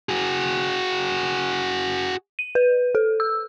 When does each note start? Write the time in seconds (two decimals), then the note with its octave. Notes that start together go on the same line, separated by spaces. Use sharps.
0.09 F#4 G#4
2.39 D#7
2.55 B4
2.95 A4
3.20 E6